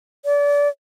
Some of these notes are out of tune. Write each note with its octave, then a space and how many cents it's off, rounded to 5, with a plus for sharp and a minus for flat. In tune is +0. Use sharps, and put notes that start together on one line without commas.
D5 -30